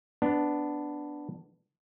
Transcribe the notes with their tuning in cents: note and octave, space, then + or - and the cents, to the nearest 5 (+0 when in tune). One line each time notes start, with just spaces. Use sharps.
B3 +5 D4 +0